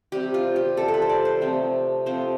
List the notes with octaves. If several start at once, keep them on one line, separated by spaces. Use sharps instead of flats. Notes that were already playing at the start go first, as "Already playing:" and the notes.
C3 G3 C4 G4
F4
G4
C3 G3 C4 A4
A4
B4
C5
D5
C5
C3 F3 A3 C4
C3 F3 A3 C4 C5